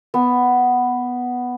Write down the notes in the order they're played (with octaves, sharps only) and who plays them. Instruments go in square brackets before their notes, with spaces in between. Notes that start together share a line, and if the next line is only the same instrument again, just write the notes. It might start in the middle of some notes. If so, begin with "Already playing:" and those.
[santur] B3